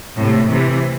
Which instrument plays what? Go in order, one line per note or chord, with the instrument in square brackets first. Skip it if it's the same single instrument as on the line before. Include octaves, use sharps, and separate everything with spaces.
[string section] A2 C3
C3 E3